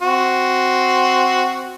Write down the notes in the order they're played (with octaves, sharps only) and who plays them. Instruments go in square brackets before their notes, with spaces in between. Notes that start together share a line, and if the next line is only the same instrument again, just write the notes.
[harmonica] C4 F#4